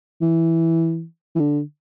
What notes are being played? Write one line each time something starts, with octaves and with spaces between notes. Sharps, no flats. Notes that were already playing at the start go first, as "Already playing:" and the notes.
E3
E3
D3